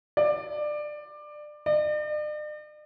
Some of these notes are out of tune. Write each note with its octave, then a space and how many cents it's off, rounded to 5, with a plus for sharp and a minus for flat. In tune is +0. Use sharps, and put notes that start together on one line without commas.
D5 +20
D5 +45